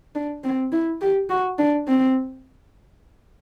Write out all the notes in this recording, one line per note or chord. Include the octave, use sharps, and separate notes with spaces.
D4
C4
E4
G4
F#4
D4
C4